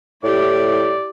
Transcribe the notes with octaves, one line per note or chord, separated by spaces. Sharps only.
A2 E4 G4 D5